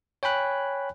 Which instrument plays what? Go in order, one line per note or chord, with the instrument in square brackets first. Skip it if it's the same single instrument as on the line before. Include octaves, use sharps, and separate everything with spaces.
[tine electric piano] C#5 G5 G#5 B5 F#6